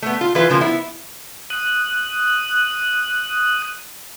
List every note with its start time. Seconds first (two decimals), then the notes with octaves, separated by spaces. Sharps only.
0.02 A3 B3
0.21 F4
0.35 E3 F4 B4
0.49 C#3 F3 A#3
0.61 B3 E4
1.50 D#6 F#6